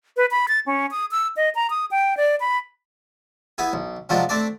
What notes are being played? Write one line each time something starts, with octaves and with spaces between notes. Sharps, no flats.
B4
B5
A6
C#4
D#6
E6
D#5
A#5
D#6
G5
D5
B5
B3 E4 G#4
B1
C3 F3 F#3 G#3 D4
A3 C4 D4 D5